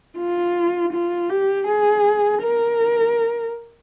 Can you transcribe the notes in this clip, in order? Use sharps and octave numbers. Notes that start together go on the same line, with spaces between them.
F4
F4
G4
G#4
A#4